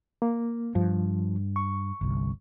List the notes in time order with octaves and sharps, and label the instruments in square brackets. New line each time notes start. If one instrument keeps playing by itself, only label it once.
[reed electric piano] A#3
[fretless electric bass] G2 [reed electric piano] F3
[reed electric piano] C#6
[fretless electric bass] G1 C2